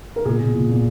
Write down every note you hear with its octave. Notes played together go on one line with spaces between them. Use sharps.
A#4
A#2 G#4
A#2
A#2
A#2